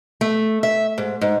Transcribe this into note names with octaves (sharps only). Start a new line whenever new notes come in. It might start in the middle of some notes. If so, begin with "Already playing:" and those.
A3
E5
G#2
G#2